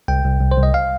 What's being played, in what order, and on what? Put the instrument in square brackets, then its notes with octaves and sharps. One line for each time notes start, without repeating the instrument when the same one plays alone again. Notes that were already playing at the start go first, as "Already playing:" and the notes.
[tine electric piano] C2 G5
C2
C2
C5
C2
D#5
F5